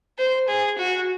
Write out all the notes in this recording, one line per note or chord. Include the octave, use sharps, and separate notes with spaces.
C5
G#4
F#4